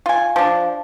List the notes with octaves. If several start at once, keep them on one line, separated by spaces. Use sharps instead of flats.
F4 G#5
F3 D4